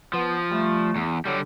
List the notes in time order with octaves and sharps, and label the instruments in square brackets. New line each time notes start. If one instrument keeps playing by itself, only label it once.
[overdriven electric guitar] F3 [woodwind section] B3
[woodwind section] G3 A3
[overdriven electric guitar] E2
[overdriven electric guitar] D3 G3 [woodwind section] F#3